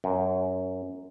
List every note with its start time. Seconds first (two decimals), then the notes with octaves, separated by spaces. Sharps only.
0.04 F#2